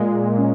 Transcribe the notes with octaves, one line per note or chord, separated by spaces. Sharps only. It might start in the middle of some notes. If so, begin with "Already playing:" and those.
Already playing: A#2 G#3
C#4